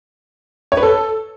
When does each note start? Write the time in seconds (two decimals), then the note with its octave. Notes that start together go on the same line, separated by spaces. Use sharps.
0.72 C#5
0.77 B4
0.83 A4